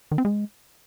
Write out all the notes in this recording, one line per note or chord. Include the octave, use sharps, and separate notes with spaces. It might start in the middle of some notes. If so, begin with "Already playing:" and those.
D#3
C4
G#3